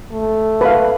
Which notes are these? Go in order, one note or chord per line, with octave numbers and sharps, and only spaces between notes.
A3
B4 F5